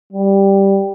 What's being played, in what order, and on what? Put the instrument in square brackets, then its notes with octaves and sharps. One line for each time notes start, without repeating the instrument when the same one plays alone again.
[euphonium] G3